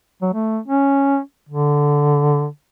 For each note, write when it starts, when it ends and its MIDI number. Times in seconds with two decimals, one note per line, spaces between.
0.22 0.30 54
0.34 0.59 57
0.68 1.19 61
1.49 2.47 50